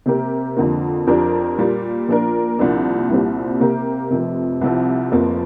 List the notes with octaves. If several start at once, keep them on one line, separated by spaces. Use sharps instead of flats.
C3 A#3 G4 A#4
F2 D3 A#3
F2 F3 D4 G4 A#4
A#2 G3 A#3
A#2 F3 D4 A#4
C2 A#2 F3 A#3 D4
C2 A#2 G3 C4
C3 A#3 G4 A#4
F1 F2 C3
C2 C3 F3
F1 F2 F3 A#3